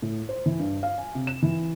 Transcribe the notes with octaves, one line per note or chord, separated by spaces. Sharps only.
A2
C5
E3
G2
F5
G#5
C3
E7
E3